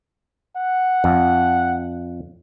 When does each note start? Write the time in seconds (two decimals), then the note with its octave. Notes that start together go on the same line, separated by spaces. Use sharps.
0.57 F#5
1.04 F2